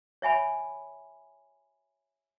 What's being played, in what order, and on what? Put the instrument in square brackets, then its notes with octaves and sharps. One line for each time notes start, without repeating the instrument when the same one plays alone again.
[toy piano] C#5 E5 G#5 B5